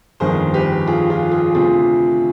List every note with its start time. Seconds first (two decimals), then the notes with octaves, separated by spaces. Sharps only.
0.20 G1 F2 D#3 G#4 C5
0.54 G4 B4
0.87 F4 G#4
1.10 F4 G#4
1.32 F4 G#4
1.55 D2 C3 F3 F4 G#4